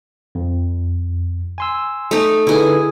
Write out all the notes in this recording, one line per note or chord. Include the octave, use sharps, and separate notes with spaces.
F2
G#5 C6 E6
A3 D#4
D3 D#4 E4 G#4 B4